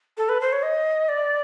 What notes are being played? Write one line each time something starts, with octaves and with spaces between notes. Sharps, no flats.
A4
B4
C5
C#5
D#5
D5